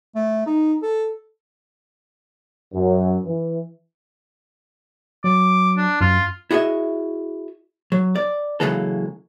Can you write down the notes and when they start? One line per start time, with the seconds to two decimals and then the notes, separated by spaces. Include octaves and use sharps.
0.15 A3
0.46 D#4
0.82 A4
2.73 F#2
3.26 E3
5.24 F#3 D6
5.77 D4
6.01 F#2 F4
6.51 E4 F#4 G#4 D#5 E5
7.92 F#3
8.16 D5
8.60 C#3 E3 F#3 G#3 A#3 A4